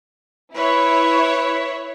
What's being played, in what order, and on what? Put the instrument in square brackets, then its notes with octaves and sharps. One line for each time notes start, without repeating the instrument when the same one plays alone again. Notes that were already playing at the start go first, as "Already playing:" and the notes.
[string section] E4 C#5 [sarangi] B4